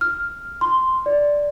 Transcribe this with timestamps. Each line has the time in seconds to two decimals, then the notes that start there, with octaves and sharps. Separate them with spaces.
0.01 F6
0.61 C6
1.06 D5